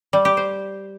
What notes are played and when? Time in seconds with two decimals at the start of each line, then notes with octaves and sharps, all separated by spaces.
0.13 G3
0.25 G4
0.37 C5